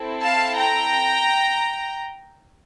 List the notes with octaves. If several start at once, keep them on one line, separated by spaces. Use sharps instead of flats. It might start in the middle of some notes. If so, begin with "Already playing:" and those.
Already playing: C4 E4 A4
F5 A5
G5 A#5